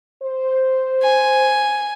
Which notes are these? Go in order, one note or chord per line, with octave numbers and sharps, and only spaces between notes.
C5
G#5